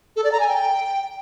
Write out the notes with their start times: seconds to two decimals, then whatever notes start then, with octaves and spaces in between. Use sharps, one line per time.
0.16 A4
0.24 D5
0.32 A#5
0.40 G#5
0.48 G5